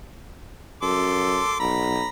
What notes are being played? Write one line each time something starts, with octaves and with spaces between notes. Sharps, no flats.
F#2 A4 C6 D6
B1 A#5 B5